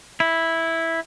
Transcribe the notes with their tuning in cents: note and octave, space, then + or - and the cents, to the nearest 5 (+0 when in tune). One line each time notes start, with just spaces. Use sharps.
E4 -5